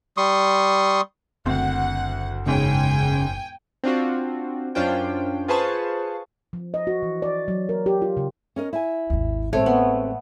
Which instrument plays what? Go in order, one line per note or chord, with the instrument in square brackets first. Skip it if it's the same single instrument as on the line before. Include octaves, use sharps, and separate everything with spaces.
[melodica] G3 C6 C#6 D#6
[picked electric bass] F#1 [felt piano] D2 C4 [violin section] F#5
[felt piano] E1 G#2 C#5 [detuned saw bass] C#3 [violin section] G5 G#5
[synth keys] C4 D4 F4 F#4
F#2 C#4 D4 F4 C5 G5
F4 G#4 B4 C5 A5 C#6
[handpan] F3
D#5
F#4
E3
D5
F#3
A#4
G4
F4
C#3
[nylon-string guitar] C#4 A#4 D#5
E4 G#5
[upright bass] G#1 D#2
[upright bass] A1 [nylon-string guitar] G#3 C4 A4 [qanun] A3 C#5
[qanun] B3